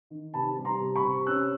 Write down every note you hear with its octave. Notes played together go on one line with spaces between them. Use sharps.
D#3
C3 A5 B5
G3
A#5 C6
C3
B5 C#6
C3
C#4 E6 F#6